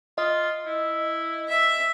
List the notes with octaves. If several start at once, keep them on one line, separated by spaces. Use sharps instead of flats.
F4 D#5
E4
E5